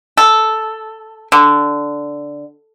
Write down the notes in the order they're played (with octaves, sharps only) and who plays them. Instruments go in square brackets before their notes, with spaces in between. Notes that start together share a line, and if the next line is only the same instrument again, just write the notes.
[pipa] A4
D3